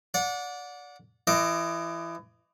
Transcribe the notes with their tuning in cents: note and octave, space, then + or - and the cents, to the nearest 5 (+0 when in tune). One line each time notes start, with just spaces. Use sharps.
D5 -20 F#5 -30
E3 +25 D#5 -10 D6 +5